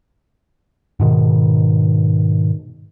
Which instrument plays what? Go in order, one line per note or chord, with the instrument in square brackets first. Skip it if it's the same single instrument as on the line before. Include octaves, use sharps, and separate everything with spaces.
[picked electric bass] G#2 B2 D#3